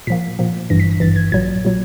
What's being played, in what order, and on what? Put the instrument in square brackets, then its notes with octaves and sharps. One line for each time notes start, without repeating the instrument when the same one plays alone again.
[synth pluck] A#2 F3 A#3 B6
A#2 F3 A#3
G#1 G2 E3 A#6
B6
A#6
G#1 G2 E3 A6
G#6
A#1 A#2 F#3 G#6
A#2 F#3